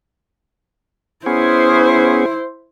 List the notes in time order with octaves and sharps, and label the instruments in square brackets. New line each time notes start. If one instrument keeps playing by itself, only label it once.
[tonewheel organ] B3 C#4 G#4 [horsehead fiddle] E4 C5